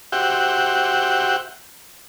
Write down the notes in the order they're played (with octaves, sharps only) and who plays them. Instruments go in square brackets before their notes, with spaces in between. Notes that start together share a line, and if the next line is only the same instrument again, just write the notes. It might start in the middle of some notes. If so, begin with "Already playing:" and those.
[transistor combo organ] F#4 G4 C5 E5 F#5 G5